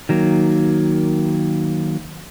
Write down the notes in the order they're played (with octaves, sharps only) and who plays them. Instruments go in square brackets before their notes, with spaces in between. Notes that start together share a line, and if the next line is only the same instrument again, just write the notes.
[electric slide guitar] D#3 F#3 A#3